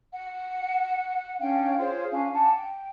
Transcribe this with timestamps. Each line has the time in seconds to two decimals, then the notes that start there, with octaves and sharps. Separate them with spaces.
0.13 F#5
1.40 C#4 D4 F5 G5
1.79 F4 G#4 C5 C#5
2.11 C#4 D4 F5 G#5
2.33 F#5 G#5 A5 D6
2.56 G5